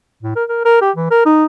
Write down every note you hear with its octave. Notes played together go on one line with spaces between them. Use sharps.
A2
A#4
A#4
A#4
G4
E3
A#4
D#4